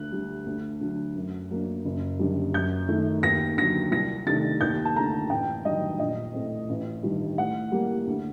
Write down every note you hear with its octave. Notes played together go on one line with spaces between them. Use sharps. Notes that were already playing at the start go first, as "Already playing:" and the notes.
Already playing: D2 F#6
D3 G3
D2
D3 F#3
F#2
F#3 A#3 D4
F#1
F#2 D3 G3
F#2 G6
D#3 A3
D#2 A#6
D3 F#3 A#6
C2 A#6
C3 D#3 A3 D4 A6
D#2 G6
A5
D3 A3 A#5
A1 G5
G2 D#3 F#3 D#5
A#1 D#5
A2 A3 C4
A1
G2 D#3 G3
A2 F#5
G3 A#3
D2